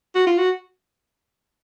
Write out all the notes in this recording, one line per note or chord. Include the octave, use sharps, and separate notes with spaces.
F#4
F4
F#4